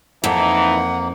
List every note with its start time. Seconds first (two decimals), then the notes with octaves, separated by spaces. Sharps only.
0.24 F2 E3 A#3 D#4 F#5